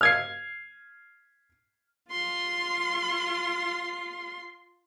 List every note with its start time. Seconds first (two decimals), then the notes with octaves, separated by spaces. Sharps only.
0.01 F6 G#6 C7
2.09 F4 C6